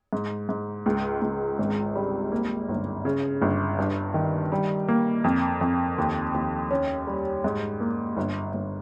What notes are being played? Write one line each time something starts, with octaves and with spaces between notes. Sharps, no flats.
G#2
G#2
C#2
C#2
G#1
G3
A#3
G1
C#3
G1
G2
D#3
G3
A#3
F2
F2
D#2
D#2
C#4
G3
G#2
A#3
G1
G1